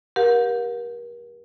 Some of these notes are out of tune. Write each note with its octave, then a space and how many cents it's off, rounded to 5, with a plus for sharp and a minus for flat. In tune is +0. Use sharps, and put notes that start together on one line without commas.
G4 +0 A#4 +35 F#5 -45